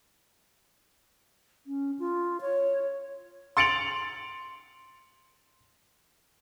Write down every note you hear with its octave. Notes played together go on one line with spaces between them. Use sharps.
C#4
F4
C#5
C6 A6 C#7 D7 F7 F#7